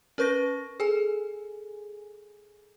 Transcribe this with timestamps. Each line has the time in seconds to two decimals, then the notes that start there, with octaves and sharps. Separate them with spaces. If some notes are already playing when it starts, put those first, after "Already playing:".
0.18 C#4 A#4 B4 C#6 A#6
0.80 G#4 A4 G#5